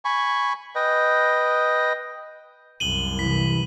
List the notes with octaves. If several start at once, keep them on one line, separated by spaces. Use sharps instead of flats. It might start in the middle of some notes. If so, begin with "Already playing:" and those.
G#5 B5 C#6
B4 D#5 G5
C2 F#2 D#7 F#7 G7
C3 E3 E4 B6